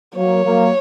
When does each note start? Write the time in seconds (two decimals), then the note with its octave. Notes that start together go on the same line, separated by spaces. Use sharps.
0.15 F#3 A#3 C#5
0.44 F#3 A#3